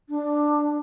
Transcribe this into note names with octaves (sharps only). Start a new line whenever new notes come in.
D4